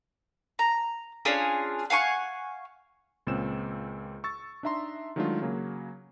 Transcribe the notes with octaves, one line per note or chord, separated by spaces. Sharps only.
A#5
C#4 D4 F4 G#4
F5 F#5 G#5 C#6
C#2 A#2 C4 C#4 E6 E7
C#6 E6 A6
D4 D#4 E5 A#5 C6
D#3 F#3 G#3 A3 D4 F4
C#3 F#3 A#3